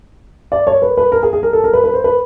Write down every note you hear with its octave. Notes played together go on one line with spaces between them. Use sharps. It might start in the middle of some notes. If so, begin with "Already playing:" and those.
D5
C#5
B4
B4
A#4
G#4
G#4
A#4
A4
A#4
B4
B4
C5
B4